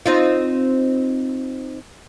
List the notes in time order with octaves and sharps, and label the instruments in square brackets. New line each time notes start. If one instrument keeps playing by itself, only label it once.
[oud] C4 D#4 F4